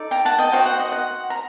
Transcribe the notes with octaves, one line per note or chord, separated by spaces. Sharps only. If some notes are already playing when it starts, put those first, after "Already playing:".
Already playing: D#4 A4 D5
G5 A#5
F#5 A5
D#5 G5
D#4 F#4 C5 D#5 G5
F#5
D#5
F#5
A#5